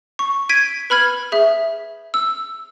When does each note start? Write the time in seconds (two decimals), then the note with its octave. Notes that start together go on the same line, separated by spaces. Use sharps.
0.19 C#6
0.49 G#6 B6 D7 D#7
0.90 B4 B5 F6 G#6
1.32 G#4 E5
2.14 E6